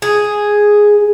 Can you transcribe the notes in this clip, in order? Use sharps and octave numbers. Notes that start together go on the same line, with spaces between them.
G#4